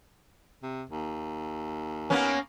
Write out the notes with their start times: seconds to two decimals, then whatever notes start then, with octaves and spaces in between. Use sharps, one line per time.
0.63 C3
0.89 D#2
2.10 A#3 B3 C#4